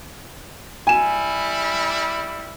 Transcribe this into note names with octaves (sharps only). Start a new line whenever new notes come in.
G3 E4 G#5 E7